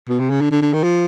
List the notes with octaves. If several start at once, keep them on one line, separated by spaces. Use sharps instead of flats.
B2
C3
C#3
D3
D3
D3
D#3
F3